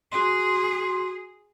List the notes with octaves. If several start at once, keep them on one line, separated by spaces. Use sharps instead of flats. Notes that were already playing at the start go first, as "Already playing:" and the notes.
F#4 G#4 C6